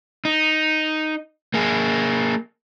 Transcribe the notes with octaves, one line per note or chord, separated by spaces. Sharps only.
D#4
A#3 G#4